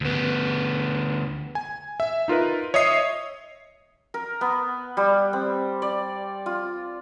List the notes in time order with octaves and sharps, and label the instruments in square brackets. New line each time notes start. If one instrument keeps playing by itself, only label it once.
[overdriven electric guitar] D2 B3
[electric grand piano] G#5
E5
D#4 F4 A#4 B4
C#5 D#5 E5 D#6 C7
[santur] A#4
B3
G3
C4
D5
F4